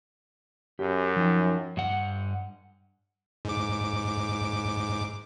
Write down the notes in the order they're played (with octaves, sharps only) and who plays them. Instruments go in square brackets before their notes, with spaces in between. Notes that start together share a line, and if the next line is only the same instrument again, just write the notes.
[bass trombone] F#2 [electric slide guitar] G4
[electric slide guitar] F3 D#4 G5
G2 F#5
[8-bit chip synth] G#2 D6